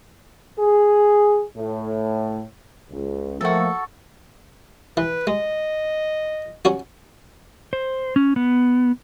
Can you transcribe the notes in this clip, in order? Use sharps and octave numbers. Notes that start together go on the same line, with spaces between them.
G#4
A2
C#2
F3 A3 A#3 F#4 A4
E3 B4
G#3 D#5
F#3 C#4 F#4
C5
C#4
B3